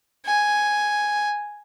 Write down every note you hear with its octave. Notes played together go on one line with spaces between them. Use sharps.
G#5